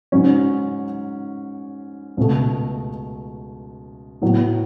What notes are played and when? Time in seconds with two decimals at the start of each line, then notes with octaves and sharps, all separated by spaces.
0.12 G#2 F#3 C#4
2.17 C#2 B2 A3
4.22 A2 F#3 B3